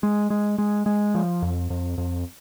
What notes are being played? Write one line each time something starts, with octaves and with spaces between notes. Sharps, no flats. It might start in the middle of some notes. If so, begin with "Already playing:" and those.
G#3
G#3
G#3
G#3
F3
F2
F2
F2